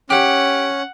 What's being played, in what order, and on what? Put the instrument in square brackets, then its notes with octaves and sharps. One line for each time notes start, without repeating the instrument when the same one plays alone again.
[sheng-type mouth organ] C#4 [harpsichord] G4 [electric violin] F#5